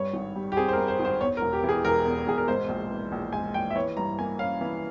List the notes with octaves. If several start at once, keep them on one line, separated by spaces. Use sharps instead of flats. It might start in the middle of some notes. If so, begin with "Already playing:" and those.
Already playing: G2 C#5
G#1
G3
G4
C4 G#4
C5
A#4
G2
C5
G#1
C5
E2 C#5
A#4
E1
G4
E3
G#4
E1 A#4
E2
E1 G#4
A#4
G#2 C5
A#1
E3
A#1
G#2 G#5
A#1 G5
E5
E3 C#5
G2 A#5
A#3 G#5
C#4 F5
E3